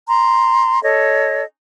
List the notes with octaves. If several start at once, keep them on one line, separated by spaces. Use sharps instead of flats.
A#5 C6
A4 C#5 D#5